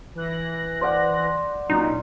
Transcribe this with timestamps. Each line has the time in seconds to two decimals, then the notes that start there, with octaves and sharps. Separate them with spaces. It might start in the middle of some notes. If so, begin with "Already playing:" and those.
0.15 E3 F#6 A#6
0.81 C5 D5 F#5
1.70 A#2 F#3 C#4 D#4